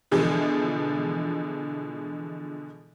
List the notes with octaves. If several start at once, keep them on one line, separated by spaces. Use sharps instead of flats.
B2 D3 E3 F3 G#3